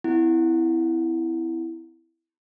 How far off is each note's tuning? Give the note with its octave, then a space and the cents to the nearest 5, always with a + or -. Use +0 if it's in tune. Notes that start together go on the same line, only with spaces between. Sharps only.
C4 -40 E4 +0 F#5 +0